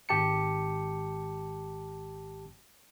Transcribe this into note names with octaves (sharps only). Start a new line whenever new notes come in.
G#1 G4 A5 C#7